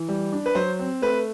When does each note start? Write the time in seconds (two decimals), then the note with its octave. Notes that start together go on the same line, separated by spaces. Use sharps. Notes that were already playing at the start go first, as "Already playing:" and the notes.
Already playing: E3
0.08 G3
0.32 D4
0.46 B4
0.55 F#3 C5
0.80 C4
1.02 A3 B4